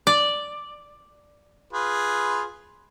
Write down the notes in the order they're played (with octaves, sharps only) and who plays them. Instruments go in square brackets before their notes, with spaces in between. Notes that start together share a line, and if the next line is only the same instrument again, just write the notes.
[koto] D5
[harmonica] F4 G#4 B4